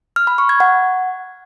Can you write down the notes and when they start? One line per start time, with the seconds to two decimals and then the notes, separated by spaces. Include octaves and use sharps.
0.16 F6
0.27 B5
0.38 C#6
0.49 G#6
0.60 F#5